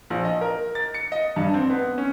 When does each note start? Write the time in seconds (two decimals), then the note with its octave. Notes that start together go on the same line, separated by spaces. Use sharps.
0.10 A#1
0.25 D#5
0.41 A#4
0.75 A6
0.94 C#7
1.12 D#5
1.36 G2
1.54 C4
1.70 B3
1.98 C#4